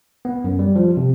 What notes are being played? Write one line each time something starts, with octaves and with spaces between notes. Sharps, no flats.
B3
F#2
G3
F3
C3